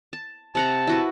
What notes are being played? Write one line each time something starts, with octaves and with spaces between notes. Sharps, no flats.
A5
C3 F#5 A5 A#5
E4 F#4 B4